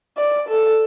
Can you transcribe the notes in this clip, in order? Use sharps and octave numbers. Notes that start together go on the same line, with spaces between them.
D5
A4